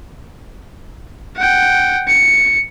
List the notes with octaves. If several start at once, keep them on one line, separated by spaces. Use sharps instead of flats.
F#5 G5
C#7